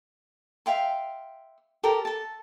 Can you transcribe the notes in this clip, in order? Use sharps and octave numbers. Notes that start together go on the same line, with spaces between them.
E5 F5 G5 C6
G4 A4 A#4 G5
A4 A5